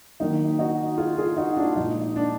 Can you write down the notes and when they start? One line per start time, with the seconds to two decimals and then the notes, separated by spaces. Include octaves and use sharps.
0.20 D#3 F#3 A#3 D#4
0.59 D#4 F#4
0.98 F4 G#4
1.17 F4 G#4
1.37 D#4 F#4
1.57 D4 F4
1.76 A#2 F3 G#3 D#4
2.16 D4